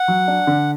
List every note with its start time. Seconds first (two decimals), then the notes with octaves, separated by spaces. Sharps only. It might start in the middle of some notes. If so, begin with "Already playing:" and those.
Already playing: F#5
0.08 F#3
0.28 D4
0.47 D3